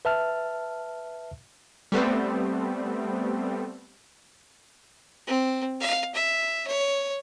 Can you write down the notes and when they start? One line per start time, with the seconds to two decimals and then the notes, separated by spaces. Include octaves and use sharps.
0.05 B4 E5 A5 F6
1.92 G3 A3 B3 C4
5.27 C4
5.81 F5
6.15 E5
6.67 C#5